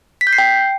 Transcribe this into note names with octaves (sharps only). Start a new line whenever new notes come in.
B6
G6
C7
G5